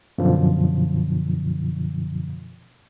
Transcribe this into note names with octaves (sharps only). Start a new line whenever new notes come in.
F#2 B2 D3 F3